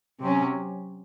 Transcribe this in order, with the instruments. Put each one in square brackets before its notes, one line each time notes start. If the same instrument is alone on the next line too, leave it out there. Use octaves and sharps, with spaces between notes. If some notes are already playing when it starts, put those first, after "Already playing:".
[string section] C3 F#3 C#4